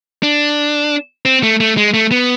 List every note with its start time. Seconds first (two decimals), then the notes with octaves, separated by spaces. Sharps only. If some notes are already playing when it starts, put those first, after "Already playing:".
0.23 D4
1.25 C4
1.43 A3
1.60 A3
1.77 G#3
1.94 A3
2.11 B3